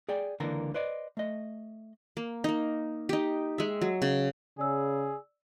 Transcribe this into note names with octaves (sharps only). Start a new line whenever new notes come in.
G#4 D5 G5
C#2 D3 E3 A#3 A#5
B4 C5 D5 D#5
A3 D#5
A#3
A#3 D#4
D#4 G4
G#3 E5
F#3
C#3
C#3 G#4 D5 E6